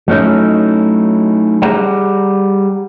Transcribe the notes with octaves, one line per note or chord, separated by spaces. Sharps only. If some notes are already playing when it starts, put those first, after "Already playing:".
F#3 A3 C#4 D#4 E4
G3 G#4 F#5 A#5